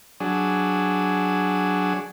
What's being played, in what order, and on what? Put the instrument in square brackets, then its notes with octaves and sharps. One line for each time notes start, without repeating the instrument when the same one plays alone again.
[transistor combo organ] F#3 D4 G#4